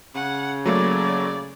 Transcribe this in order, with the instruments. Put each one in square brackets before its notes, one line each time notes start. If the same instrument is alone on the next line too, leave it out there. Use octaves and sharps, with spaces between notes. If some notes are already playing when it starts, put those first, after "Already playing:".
[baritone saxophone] C#3 [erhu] F#5
[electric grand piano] F#3 A3 A#3 [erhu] D5